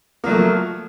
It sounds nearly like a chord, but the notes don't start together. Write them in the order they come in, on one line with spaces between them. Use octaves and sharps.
A#3 F#3 A3 F3